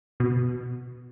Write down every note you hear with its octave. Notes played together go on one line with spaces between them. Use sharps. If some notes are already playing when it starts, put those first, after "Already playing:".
B2